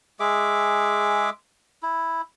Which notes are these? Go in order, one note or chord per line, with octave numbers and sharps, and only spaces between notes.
G#3 G#4 E5 D6
E4